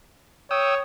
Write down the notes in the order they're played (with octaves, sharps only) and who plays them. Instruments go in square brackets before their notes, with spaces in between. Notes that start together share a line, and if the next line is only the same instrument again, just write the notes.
[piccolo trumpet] C#5 [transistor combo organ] G5 D#6 E6